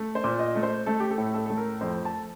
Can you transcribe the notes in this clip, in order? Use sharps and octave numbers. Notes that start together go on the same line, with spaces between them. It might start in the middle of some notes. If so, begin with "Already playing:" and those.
Already playing: A3
C5
A#2
D#5
A3
C5
A3 A4
G4
A4
A2
A4
A3 A4
A#4
F2 C5
A5